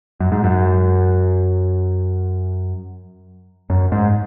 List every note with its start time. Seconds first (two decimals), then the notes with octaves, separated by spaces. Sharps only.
0.20 F#2
0.32 G#2
0.44 F#2
3.70 F#2
3.92 G#2